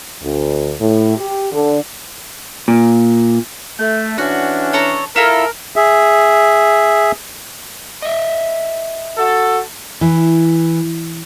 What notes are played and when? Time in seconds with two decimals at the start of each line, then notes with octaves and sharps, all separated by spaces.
0.22 D2
0.80 A2
1.17 G4
1.52 D3
2.68 A#2
3.80 A3
4.18 E3 C#4 D4 F#4
4.73 A4 C#5 A#5
5.16 E4 F4 A4 A#4
5.76 G#4 E5
8.02 D#5 E5
9.17 F#4 A4
10.01 E3